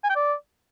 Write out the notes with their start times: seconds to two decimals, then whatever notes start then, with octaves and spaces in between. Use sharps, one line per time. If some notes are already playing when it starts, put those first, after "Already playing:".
0.04 G#5
0.10 G5
0.16 D5